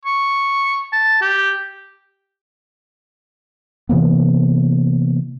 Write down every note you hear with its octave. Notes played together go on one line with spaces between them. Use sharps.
C#6
A5
G4
C3 E3 A#3 B3